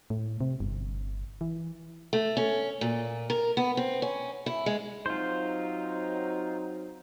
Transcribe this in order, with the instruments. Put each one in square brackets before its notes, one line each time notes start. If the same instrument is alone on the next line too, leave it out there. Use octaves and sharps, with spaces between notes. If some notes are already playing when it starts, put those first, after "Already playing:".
[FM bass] A2
C3
G1
E3
[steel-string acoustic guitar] A3
C#4
A#2
A#4
B3
C4
C#4
E4
G#3
[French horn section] F#3 C4 D#4 [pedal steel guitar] F4 C5